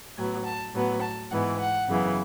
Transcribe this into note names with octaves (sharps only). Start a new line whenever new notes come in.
A2 F#3 B3 G#5
A5
A2 F#3 B3
A5
G#2 E3 B3 F#5
F#5
F#2 C#3 E3 B3